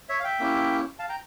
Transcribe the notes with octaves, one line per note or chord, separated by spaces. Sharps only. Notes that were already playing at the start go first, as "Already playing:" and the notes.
C#5 E5
F5
E5 G5
A#3 C#4 E4 G4
F5 A5
G5 A#5